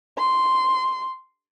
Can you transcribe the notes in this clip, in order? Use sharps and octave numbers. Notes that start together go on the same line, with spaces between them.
C6